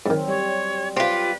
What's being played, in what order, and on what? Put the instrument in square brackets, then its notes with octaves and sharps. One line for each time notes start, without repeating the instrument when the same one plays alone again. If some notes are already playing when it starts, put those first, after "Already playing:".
[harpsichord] G#2 D#3 [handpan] F#3 C4
[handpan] G3 [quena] C#5
[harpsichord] C4 C6 [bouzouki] F4 G4 [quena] B4